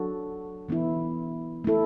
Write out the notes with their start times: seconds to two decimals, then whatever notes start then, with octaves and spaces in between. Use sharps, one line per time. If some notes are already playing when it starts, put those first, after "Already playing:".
Already playing: F#3 D4 F#4 A4
0.69 E3 B3 E4
1.64 A3 E4 A4